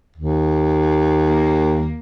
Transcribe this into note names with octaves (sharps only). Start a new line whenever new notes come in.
D#2
A#3